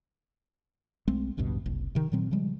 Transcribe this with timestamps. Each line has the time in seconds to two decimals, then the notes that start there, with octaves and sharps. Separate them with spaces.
1.08 B1 G#3 A3 C4
1.37 A1 D2 G2 B2
1.66 F#1 C2
1.95 C3 D#3
2.12 A#2 D#3 F#3 C4
2.31 C#3 F3 G3 G#3